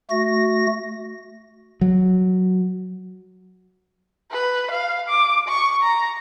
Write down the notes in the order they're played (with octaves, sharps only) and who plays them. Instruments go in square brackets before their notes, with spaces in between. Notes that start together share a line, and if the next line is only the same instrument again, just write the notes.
[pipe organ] A3 F#4 A#6
[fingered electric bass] F#3
[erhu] B4
F5
D6
C#6
A#5